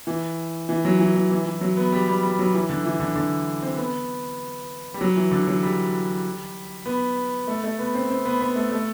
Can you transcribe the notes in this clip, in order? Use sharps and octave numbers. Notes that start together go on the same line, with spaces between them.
E3
E3
F#3
E3
E3
E3
E3
F#3
B3
G3
G3
G3
F#3
E3
D3
E3
D3
D3
C4
B3
G3
F#3
E3
D3
F#3
G3
B3
A3
A3
B3
C4
C4
B3
B3
A3
A3